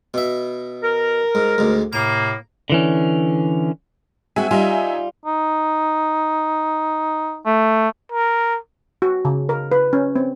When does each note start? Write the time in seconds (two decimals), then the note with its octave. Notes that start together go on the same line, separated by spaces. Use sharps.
0.14 B2 E5
0.83 A#4
1.35 G#2
1.58 D2 G#2
1.93 A2 C3 A#3 A#5
2.70 D3 E3 C#4
4.36 G#3 C4 F#4 E5 G#5
4.51 G3 D#4 F4 E5 G#5
5.25 D#4
7.46 A3
8.12 A#4
9.02 F#4
9.25 C#3
9.49 A#4
9.72 B4
9.93 C#4
10.16 C4